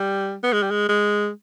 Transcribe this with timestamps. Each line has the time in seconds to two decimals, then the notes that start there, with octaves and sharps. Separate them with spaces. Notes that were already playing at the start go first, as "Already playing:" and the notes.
Already playing: G3
0.44 B3
0.53 G#3
0.63 G3
0.71 G#3
0.89 G#3